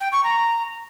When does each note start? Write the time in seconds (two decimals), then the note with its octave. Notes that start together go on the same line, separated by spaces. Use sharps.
0.01 G5
0.12 C#6
0.24 A#5